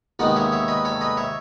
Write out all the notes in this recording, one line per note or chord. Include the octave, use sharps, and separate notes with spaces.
D#2 D#3 G#3 B3 D#4 D#5 F#5
C#5 E5
C#5 E5
B4 D#5
A4 C#5
B4 D#5
C#5 E5